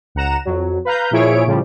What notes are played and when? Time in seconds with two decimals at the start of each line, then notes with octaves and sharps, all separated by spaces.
0.15 C#2 F#5 A#5 E7
0.45 F2 F#3
0.85 B4 F5 A#5 G6
1.11 A#2 F3 E4 G#4 C#5 D7
1.46 A2 C#3 F3 G3